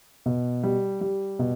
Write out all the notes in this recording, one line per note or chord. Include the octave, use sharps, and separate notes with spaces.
B2
G3
G3
B2